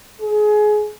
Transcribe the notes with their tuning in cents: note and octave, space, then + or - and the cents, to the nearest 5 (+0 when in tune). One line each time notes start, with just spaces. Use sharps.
G#4 +25